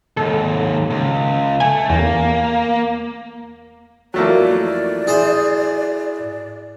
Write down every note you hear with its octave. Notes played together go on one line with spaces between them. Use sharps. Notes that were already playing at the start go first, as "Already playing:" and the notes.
D#2 G#2 A4
C#2
A3 G#5
E2 A#3
F2 E3 F#3 A3 A#3 D5
E4 G#4 C5